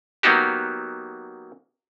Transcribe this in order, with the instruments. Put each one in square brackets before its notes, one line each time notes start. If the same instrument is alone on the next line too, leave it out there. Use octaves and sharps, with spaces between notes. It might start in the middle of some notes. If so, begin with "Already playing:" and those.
[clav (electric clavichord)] F#3 A#3 B3 D#4 F#4 G4